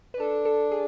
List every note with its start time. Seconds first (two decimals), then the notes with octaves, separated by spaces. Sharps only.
0.14 B4
0.19 D4 A4
0.45 A4
0.71 G#4